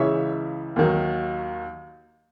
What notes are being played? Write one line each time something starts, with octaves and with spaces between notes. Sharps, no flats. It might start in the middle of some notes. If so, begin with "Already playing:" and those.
Already playing: C#2 C#3 E3 C#5 E5
D#2 D#3 F#3